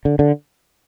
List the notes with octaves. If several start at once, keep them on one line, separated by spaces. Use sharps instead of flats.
D3
D3